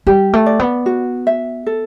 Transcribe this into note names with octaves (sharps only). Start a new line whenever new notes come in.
G3 G4
A3
D5
B3
F#4
E5
A4